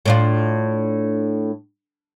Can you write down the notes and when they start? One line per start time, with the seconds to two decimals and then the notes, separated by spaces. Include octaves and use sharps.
0.06 A2 D4 F4